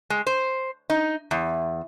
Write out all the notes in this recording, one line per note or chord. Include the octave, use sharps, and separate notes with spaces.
G#3
C5
D#4
E2